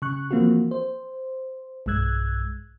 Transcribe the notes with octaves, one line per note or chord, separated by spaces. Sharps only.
C#3 C#6 F#6
E3 F3 A#3 C4 F4 F#4
C5
B1 G2 G#3 E6 F#6 G#6